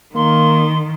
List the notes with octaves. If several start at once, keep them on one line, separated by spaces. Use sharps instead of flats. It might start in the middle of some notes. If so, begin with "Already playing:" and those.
D#3 A#3 C6